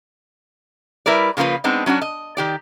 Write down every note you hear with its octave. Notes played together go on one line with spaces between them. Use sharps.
G3 E4 A#4 B4 D5
C#3 F3 A#3 F4 B4
G#3 B3 C4 D4 D#4
F#3 C#4 D4 F#4
D#5
D#3 G4 D5